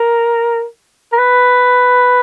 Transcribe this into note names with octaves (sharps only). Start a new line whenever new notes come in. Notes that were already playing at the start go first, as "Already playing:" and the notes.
Already playing: A#4
A#4
B4